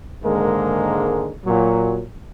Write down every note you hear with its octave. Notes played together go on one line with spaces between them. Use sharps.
G#2 D3 D#3 G#3 A#3 A#4
A#2 F#3